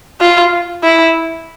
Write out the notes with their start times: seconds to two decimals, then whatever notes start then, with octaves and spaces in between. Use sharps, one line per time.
0.21 F4
0.83 E4